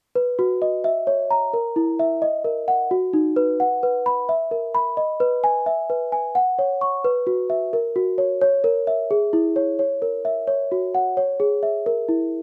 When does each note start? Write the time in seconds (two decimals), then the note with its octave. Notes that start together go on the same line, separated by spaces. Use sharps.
0.15 B4
0.39 F#4
0.62 D#5
0.84 E5
1.07 C#5
1.31 A#5
1.53 A#4
1.76 E4
1.99 E5
2.22 D#5
2.44 A#4
2.68 F#5
2.91 F#4
3.13 D#4
3.36 B4
3.60 F#5
3.83 B4
4.06 B5
4.29 E5
4.51 A#4
4.75 B5
4.97 D#5
5.20 B4
5.44 G#5
5.66 E5
5.90 B4
6.12 G#5
6.35 F#5
6.59 C#5
6.81 C#6
7.04 B4
7.27 F#4
7.50 E5
7.73 A#4
7.96 F#4
8.18 C#5
8.41 C#5
8.64 A#4
8.87 E5
9.11 G#4
9.33 E4
9.56 C#5
9.79 C#5
10.02 A#4
10.25 E5
10.47 C#5
10.72 F#4
10.95 F#5
11.17 C#5
11.40 G#4
11.63 E5
11.86 A#4
12.09 E4